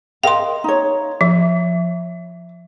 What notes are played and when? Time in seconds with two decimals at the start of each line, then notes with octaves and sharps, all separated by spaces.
0.23 A#4 D#5 F5 G5 C6
0.64 D#4 C#5
1.21 F3 E5